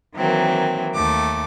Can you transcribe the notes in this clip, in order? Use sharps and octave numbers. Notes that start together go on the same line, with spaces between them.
D#3 E3 F#3 A#3 C4
D#2 A3 D6